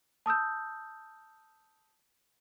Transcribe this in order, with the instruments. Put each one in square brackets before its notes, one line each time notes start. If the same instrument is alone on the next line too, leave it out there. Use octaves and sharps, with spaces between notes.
[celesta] A5 D#6 E6 G6